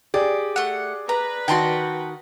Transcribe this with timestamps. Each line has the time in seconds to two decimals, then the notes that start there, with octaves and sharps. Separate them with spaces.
0.14 G4 G#4 D5
0.56 A3 F#5
1.09 B4 A#5
1.48 D#3 F#4 G5 A5 C6